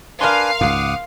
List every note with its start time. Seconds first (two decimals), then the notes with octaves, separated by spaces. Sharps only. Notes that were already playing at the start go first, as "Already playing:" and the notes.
0.21 D4 A#4 B4 F5 G#5 C6
0.61 C#2 G#2 F#5 D6 D#6